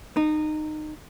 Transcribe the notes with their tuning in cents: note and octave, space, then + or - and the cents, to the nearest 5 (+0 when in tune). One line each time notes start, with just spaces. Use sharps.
D#4 -20